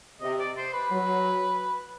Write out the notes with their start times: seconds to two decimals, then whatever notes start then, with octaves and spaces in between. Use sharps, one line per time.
0.21 C3 D#5
0.39 D5
0.56 C5
0.73 B4
0.90 F#3